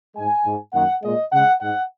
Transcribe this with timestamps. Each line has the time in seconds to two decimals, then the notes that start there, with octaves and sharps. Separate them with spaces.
0.16 G#2 G#3 G#5
0.45 G#2 G#3
0.74 F#2 D#3 A#3 F#5
1.03 A#2 G#3 D#5
1.32 C#3 G#3 F#5
1.61 G#2 G#3 F#5